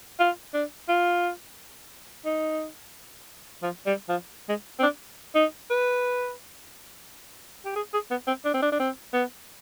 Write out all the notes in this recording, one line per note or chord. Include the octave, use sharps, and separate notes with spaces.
F4
D4
F4
D#4
F3
G3
F3
G#3
C4
D4
D#4
B4
G4
G#4
G#4
B3
C4
D4
C4
D4
D4
C4
B3